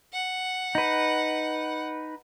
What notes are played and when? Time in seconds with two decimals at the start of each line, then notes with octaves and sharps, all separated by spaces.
0.13 F#5
0.75 D#4 B4